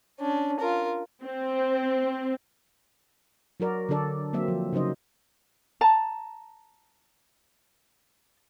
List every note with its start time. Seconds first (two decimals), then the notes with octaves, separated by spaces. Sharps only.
0.20 C#4 D4
0.59 F4 A#4
1.23 C4
3.60 F#3 F#4 A#4 D5
3.89 D3 F#3 D4 A4 D5
4.33 F#3 A#3 C4 E5
4.48 F3
4.73 C#3 F#3 D#4 C5 D#5
5.81 A5 A#5